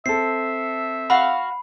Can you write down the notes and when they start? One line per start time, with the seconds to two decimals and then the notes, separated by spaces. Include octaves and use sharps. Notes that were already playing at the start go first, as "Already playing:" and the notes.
0.06 C4 A4 E5 C7
1.10 F#4 F5 B5